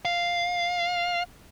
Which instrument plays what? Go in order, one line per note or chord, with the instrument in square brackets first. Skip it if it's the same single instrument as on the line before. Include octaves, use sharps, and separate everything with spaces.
[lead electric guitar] F5